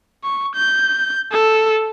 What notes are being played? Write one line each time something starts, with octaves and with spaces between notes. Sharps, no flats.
C#6
G6
A4